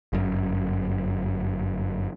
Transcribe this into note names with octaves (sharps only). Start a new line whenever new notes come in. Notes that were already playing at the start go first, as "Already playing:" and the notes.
G1 F#2